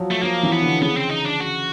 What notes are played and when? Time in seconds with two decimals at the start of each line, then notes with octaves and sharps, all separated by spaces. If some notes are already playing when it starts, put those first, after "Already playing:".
Already playing: F3 F#3
0.11 A3
0.23 F3 A#3
0.43 E3
0.53 B3
0.62 D3
0.81 C#3 B3
0.97 C4
1.11 D#4
1.26 D4
1.40 F#4